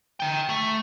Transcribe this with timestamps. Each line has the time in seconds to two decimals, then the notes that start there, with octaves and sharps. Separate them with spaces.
0.20 D#4 G5
0.49 A3